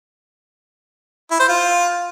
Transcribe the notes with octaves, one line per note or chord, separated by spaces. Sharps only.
E4
C5
F4